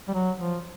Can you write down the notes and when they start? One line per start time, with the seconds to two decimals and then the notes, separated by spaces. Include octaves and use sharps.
0.08 G3
0.14 F#3
0.40 F3